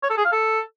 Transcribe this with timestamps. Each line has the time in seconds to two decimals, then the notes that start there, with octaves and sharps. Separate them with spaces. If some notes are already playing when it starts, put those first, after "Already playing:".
0.03 C#5
0.10 A4
0.17 G#4
0.25 F5
0.32 A4